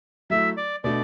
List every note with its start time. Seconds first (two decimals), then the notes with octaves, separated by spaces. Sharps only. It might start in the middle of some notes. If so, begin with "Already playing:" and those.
0.30 F#3 A3 E4 E5
0.57 D5
0.84 B2 A3 D4 D5